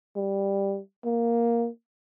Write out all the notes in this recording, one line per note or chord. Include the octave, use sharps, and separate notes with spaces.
G3
A#3